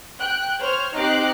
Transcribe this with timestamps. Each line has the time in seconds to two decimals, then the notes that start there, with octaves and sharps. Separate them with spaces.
0.19 G5 F#6
0.59 C5 C#5 F6
0.95 C4 D#4 G4 D6 F#6 C7